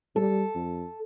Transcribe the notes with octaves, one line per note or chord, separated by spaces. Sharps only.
G3 A4
F2